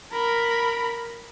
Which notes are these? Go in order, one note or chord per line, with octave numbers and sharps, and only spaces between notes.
A#4 B5